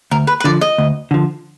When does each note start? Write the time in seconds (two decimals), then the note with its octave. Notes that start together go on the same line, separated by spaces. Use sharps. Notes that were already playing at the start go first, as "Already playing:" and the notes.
0.11 D2 A#4
0.27 B4
0.40 B4
0.44 D3 F3 D5
0.61 D#5
0.78 D2
1.11 D3 F3